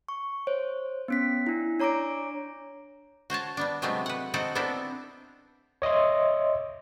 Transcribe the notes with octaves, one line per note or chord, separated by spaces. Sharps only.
C#6
C5 C#5
B3 C#4 B6
D4 E4
D4 C#5 A#5 D6 A#6 D7
F#4 C5 C#5 A5
G3 B3 D4
C3 F#3 G#3 A3 B3 C4
B4 F#5
C4 D#4 F#4 A4 F#5
B3 C4 D4 E4 A4 A#4
C#5 D#5 E5 C6